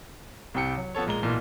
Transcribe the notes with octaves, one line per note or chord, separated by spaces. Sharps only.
C2 C3 G5 C#7
F#3
F3 B3 A4 C#5
A#2 G#3 A#5 G7
B1 A#2 E3